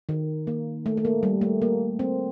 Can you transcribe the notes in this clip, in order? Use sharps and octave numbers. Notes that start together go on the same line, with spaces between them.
D#3
A#3
A3
A3
A#3
G3
A3
A#3
C4